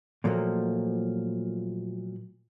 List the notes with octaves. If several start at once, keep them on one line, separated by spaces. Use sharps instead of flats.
A#2 F3 F#3 A3 A#3